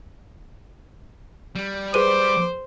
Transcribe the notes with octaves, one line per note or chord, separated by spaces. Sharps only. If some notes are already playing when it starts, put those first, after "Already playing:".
G3
G#4 B4 C5 D6 D#7